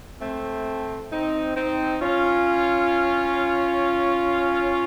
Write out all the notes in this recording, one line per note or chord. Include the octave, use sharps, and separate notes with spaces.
A3 C4
C4 D#4
C4 D#4
C#4 F4